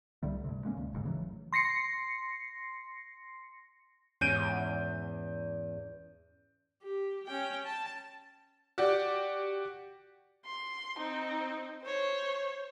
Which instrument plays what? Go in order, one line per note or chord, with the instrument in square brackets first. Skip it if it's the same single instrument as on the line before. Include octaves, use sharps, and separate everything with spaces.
[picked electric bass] C2 D3 G3 A3
G2 C3
G#3 A#3 C#4
D2
F#1 G#2 C#3
C#3 E3 F#3 A3
[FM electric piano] C6 A#6 C7 C#7
[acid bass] E2 [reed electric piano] G#2 C#4 [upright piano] G6 D7 D#7
[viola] G4
C#4 G5
A5
[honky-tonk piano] F#4 G4 D5
[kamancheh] C6
C4 D#4
C5 C#5